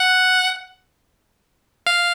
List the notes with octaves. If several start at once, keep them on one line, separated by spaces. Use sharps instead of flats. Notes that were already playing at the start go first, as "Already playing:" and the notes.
Already playing: F#5
F5